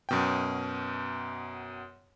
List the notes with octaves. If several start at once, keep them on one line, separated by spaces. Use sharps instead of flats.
F#2 B2 G5